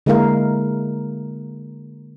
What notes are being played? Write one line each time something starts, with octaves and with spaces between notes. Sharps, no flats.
D3 G#3 A#3 E4 A#4 F5